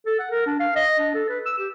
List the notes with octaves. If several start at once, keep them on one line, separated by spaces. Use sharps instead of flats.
A4
F#5
A#4
D4
F5
D#5
D4
A4
B4
E6
G4